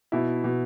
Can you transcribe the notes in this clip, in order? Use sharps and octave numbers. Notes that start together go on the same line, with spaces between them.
B2 E4
B2